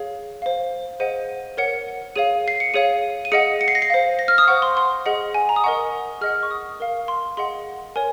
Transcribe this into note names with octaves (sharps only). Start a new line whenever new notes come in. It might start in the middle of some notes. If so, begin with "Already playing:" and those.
Already playing: G#4 C#5 F5
C5 F5
G#4 C5 D#5 F#5 D#7
A#4 C#5 F#5 C#7
G#4 C#5 F5 D#7
C7
C#7
G#4 C#5 F5 D#7
D#7
G#4 D#5 F#5 C#7
C#7
C7
A#6
C7
C5 F5
A#6
F6
D#6
C5 F#5 C#6
C6
C6
G#4 D#5 F#5
G#5
A#5
D#6
A#4 D#5 F#5 C#6
G#4 D#5 F#5 F6
C#6
D#6
A#4 F5
C6
G#4 D#5 F#5 C6
A#4 C#5 G#5